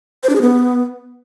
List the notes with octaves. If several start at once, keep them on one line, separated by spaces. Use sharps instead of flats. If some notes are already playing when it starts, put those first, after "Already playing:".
C5
D4
G#4
B3